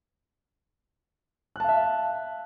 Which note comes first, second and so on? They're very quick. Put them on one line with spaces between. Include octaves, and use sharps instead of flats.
F#6 A5 F5 E5